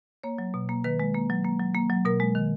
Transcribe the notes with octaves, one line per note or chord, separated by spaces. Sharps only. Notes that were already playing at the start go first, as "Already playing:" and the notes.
A#3 C#5
F#3
B2
A#3
D#3 B4
G#3
A#3
F#3
A#3
F#3
A#3
F#3
B2 A#4
G#3
D#3